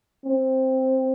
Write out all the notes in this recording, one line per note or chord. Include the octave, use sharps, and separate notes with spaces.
C4